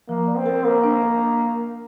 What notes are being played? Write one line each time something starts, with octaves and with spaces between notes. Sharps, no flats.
F3 A#3
D5
C4
A#4
A#3 A#4
D4
A#4